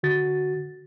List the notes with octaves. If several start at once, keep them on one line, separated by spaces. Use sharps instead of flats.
D3 F#4 A6